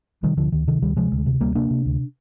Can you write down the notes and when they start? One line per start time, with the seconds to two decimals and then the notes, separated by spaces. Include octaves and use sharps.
0.23 C3 D#3 G3
0.37 D2 D3 F3
0.52 D2 D#3
0.68 C3 D#3
0.82 D2 D#3 G3
0.97 C3 F3 G#3
1.12 D2
1.26 C3
1.41 D2 G3 A#3
1.55 C3 A#3 D4
1.71 C3
1.86 D2